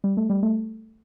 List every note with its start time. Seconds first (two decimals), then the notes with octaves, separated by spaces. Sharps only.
0.04 G3
0.17 A3
0.30 G3
0.43 A3